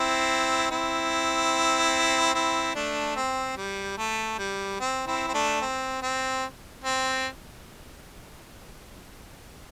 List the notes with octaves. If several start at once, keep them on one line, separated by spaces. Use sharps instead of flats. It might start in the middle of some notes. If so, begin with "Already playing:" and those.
Already playing: C4 E4
C4 E4
C4 E4
A3 D4
C4
G3
A3
G3
C4
C4 E4
C4
A3 D4
C4
C4
C4